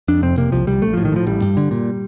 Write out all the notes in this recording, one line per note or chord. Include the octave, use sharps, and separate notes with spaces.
F2 D4
F1 C4
C3 A#3
C2 F3
C2 G3
A#1 A3
A2 F3
D#3
A2 F3
A1 G3
G2
D3
A#2